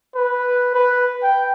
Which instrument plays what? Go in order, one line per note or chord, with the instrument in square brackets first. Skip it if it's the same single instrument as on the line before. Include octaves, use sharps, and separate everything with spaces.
[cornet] B4
B4
G5